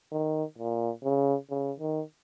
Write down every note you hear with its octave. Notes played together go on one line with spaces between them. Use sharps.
D#3
A#2
C#3
C#3
D#3